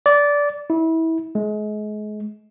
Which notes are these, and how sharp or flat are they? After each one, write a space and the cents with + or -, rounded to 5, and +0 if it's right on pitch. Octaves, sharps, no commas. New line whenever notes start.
D5 -15
E4 -25
G#3 +35